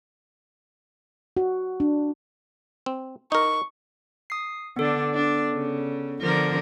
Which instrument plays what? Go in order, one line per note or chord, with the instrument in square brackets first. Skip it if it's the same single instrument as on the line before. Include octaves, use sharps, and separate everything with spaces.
[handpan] F#4
D4
[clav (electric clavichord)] C4
[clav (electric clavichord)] D#4 A#4 [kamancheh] C#6
[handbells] D#6 C7
[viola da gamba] D3 D4 [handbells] B3 A4
[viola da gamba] D4
C#3
D3 F3 A#4